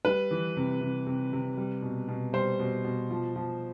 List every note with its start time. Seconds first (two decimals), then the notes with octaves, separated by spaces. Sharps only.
0.05 G3 B4
0.31 E3
0.57 C3
0.81 C3
1.06 C3
1.33 C3
1.57 G3
1.82 B2
2.08 B2
2.33 G3 C5
2.59 B2
2.84 B2
3.10 F3
3.36 F3